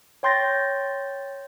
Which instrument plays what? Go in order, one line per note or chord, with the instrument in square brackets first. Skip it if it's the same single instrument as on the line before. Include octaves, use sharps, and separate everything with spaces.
[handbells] C#5 G5 C6 G6 A6 A#6